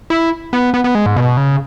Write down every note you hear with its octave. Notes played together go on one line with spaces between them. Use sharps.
E4
B3
B3
B3
G#3
G#2
B2
C#3